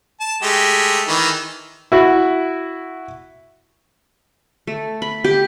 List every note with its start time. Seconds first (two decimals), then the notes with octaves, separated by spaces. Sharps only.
0.20 A5
0.43 G#3 A3 G4
1.08 D#3 E3
1.92 E4 F#4
4.67 A3
5.02 B5
5.24 G4